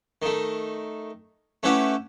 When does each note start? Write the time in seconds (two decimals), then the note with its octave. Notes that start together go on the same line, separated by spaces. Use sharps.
0.22 D#3 A3
1.63 A3 C#4 E4 G4 B4 F#5